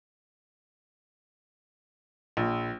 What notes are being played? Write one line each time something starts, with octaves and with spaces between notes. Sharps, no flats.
A#1